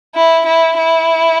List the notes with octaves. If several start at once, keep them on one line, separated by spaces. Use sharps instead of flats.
E4
E4
E4